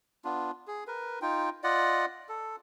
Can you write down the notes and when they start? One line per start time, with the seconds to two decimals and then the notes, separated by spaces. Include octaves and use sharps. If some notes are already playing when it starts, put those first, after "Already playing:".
0.25 B3 D4 F4
0.67 G#4
0.87 A#4 B4
1.22 D#4 F4 G5
1.64 F4 D5 D#5 F#5
2.29 A4